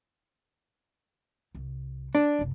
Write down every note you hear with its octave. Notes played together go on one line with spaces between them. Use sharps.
C2
D4
F#1 C2